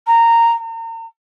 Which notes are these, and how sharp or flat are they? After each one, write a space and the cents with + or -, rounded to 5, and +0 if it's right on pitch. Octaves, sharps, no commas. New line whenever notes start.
A#5 -15
A#5 -40